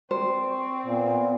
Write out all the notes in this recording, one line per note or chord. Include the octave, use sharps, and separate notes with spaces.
C4 C5 D5
C#6
A#2 B3